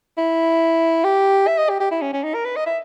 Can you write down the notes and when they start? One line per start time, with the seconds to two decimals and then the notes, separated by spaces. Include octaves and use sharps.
0.18 E4
1.05 G4
1.48 E5
1.58 D#5
1.69 G4
1.80 G4
1.91 E4
2.02 C#4
2.13 C#4
2.24 D#4
2.35 A#4
2.45 B4
2.56 D#5
2.66 E5